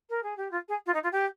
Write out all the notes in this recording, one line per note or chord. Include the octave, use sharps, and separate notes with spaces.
A#4
G#4
G4
F4
G#4
F4
D#4
F4
G4